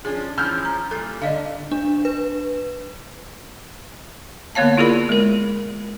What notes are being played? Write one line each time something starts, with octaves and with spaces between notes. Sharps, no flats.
F3 C#4 D4 G#4
E3 F3 C#4 E6 F6 G6
A#5
A#2 G3 A4
D3 D5 D#5 F5
D4
B4
D3 A#3 B3 C#5 F5 A5
E4 F4 G#4 A#4 D5 B5
G#3 A#4